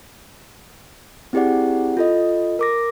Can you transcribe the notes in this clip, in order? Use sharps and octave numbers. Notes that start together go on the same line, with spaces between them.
C4 E4 G4 G#4 D5 F#5
F4 A4 D#5
A#4 D6 A#6